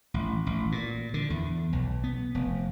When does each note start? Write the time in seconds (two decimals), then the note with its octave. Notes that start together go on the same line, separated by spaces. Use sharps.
0.14 A1
0.47 A1
0.72 A#2
1.14 D3
1.30 E2
1.73 B1
2.04 B3
2.35 F1